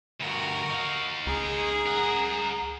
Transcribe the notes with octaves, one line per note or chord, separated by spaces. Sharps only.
D2 G2 F#4 A#4
D#4 F5
C#2 G#4 A#5
A#4 F#5